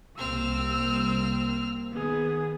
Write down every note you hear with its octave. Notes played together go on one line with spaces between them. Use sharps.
C2 A#3 C4 E6 F6
D#3 B3 G#4